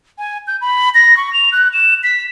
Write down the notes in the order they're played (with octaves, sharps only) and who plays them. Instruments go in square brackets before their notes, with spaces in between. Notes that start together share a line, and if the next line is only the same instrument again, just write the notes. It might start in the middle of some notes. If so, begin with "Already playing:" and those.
[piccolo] G#5
G6
B5
A#6
C#6
F7
F#6
E7
B6